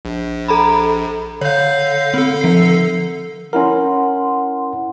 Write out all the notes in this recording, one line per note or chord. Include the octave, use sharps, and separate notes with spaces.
A#1
A4 A#5 B5
D3 C#5 F5 G6
D3 C4 A4
F3 C7
C#4 E4 A#4 F#5 C6